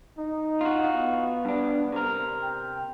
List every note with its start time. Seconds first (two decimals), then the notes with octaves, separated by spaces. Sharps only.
0.18 D#4
0.61 F4 F#4
0.94 B3
1.45 G2 D4
1.92 C3 A#4
2.43 G5